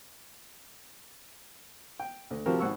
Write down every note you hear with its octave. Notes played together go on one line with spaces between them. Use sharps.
G5
D2
C3 F3 F#4 G4 A#4
G#1 F#5 C#6 E6